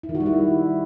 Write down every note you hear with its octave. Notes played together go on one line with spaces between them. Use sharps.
E4
D#3
F#4
G3
E4